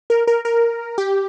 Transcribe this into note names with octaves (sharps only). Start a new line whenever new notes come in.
A#4
A#4
A#4
G4